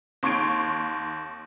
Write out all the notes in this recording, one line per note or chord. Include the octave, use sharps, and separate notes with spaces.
D#2 C6 C#6 G#6 D7